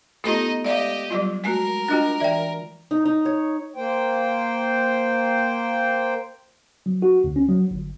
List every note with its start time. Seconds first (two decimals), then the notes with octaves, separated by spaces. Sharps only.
0.24 A3 B3 D#4 F4 G4 A4 D#5
0.65 G#3 G4 D5 D#5 F5
1.10 F#3 G3 F4
1.44 G#3 A3 F#4 A#4
1.88 D4 F4 F#4 D#5 G5 F#6
2.20 E3 D5 E5 G5
2.91 D#4
3.05 D#4
3.25 C#5
3.76 A#3 C5 G5
6.86 F#3
7.02 F#4
7.24 D2
7.36 C#4
7.49 F#3
7.71 G1